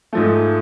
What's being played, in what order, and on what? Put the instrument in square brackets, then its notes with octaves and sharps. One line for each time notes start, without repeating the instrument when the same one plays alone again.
[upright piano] G#2 F3 A3